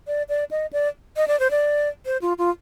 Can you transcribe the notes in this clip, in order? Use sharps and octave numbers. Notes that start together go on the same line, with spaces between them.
D5
D5
D#5
D5
D#5
D5
C5
D5
C5
F4
F4